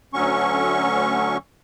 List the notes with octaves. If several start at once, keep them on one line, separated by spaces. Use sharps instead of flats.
D2 D3 F#3 C#4 C#6